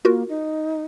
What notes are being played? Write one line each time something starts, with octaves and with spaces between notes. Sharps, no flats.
A#3 F4 F#4 A#4
D#4